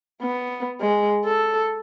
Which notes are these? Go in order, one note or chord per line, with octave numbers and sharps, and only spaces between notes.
B3
G#3
A4